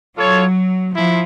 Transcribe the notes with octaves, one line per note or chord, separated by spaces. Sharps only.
F#3 F4 A4 C#5
F3 E4